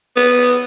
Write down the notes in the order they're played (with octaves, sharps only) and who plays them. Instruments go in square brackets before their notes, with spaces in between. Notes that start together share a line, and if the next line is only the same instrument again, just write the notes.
[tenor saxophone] B3